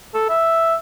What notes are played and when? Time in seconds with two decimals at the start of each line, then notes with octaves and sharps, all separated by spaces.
0.14 A4
0.29 E5